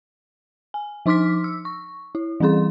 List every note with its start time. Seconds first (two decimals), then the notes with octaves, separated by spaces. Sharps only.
0.74 G#5
1.06 F3 D#4 C6 D6 F6 B6
1.44 E6
1.65 C#6
2.15 E4
2.40 E3 G3 C4 G#4 C6